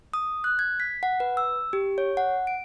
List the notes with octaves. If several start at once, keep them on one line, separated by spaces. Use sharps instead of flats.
D#6
F#6
G#6
B6
F#5
B4
E6
G4
C#5
F#5
D7